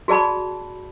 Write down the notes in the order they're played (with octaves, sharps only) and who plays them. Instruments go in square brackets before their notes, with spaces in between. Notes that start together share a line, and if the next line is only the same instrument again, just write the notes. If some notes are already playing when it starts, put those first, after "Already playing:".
[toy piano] F#4 G#4 D5 A5 B5